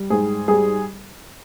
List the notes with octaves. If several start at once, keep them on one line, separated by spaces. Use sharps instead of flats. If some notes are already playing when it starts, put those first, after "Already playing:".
Already playing: G3
G#2 G#4
G3 G#4